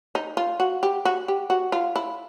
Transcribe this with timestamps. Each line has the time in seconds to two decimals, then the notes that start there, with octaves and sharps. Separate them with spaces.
0.15 D#4
0.37 F4
0.60 F#4
0.83 G4
1.05 F#4
1.28 G4
1.50 F#4
1.72 F4
1.96 E4